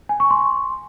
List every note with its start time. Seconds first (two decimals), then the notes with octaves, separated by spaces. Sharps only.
0.09 G#5
0.20 C#6
0.31 C6